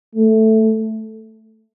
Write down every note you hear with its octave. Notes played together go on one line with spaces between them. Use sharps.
A3